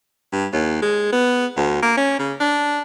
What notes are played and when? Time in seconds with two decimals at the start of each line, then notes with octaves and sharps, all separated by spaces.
0.32 G2
0.53 D#2
0.82 G#3
1.12 B3
1.57 D2
1.82 A#3
1.97 C#4
2.19 C#3
2.40 D4